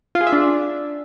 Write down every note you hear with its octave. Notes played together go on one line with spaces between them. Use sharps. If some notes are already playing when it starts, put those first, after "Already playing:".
F4
G#4
E5
D4